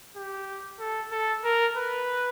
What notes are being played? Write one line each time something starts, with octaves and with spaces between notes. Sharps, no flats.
G4
A4
A4
A#4
B4